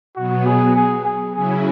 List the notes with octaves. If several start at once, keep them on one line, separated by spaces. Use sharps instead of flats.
B2 F#3 B3 F#4
G#4
G#4
G#4
C#3 F#3 C#4 E4 G#4